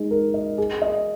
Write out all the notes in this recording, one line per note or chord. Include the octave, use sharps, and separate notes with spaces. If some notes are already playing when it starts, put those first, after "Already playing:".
Already playing: G#3 D#4
A#4
D#5
G#4
D#5